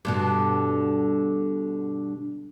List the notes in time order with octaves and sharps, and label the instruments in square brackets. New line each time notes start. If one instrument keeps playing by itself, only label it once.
[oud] G2 B2 D3